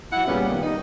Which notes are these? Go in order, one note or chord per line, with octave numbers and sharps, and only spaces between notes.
F#3 E4 F#5
A#2 C#3 G3 B3 C#4
F#2 B2 D#3 G3 B3
D#4